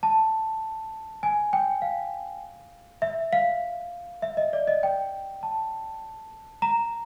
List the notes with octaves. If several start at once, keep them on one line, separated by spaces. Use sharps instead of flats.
A5
G#5
G5
F5
E5
F5
E5
D#5
D5
D#5
G5
A5
A#5